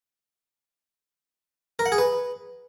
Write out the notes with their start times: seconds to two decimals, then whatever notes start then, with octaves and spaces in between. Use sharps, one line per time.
1.79 A#4
1.86 F#5
1.92 G#4
1.98 B4